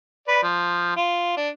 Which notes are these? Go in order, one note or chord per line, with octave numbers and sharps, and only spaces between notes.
B4 D5
F3
F4
D4